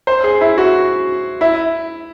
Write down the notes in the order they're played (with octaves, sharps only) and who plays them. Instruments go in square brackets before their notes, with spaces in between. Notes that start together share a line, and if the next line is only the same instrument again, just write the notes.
[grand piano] C5
G#4
E4
F#4
E4